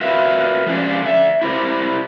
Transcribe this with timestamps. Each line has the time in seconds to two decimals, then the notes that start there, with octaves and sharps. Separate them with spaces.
0.01 F4 F#4 A#4 B4 D#5 E5
0.66 F3 G#3 A#3 C#4 D4 G4
1.02 D3 E5
1.41 E4 G4 A#4 C5